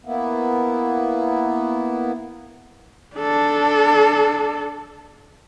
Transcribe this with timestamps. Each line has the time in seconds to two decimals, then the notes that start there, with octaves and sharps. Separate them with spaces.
0.05 A#3 B3 E4
3.17 D4 A4